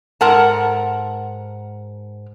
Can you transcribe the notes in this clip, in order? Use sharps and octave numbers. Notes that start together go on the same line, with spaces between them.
G#2 A#4 F#5 A5